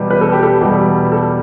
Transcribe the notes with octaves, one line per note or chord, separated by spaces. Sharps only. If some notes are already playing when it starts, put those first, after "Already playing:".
Already playing: E2 B2 G3
B4
A4
G4
A4
E2 B2 G3
A4